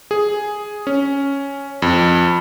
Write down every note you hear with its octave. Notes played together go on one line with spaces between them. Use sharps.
G#4
C#4
F2